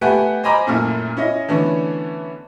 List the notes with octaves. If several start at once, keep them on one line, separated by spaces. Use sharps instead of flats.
A3 B3 G4 B4 F#5 G#5
C5 D#5 G#5 A#5 B5 D6
F#2 A#2 A3 E4 F6
C#4 E4 D#5
D3 E3 A3 B3 C#4 D4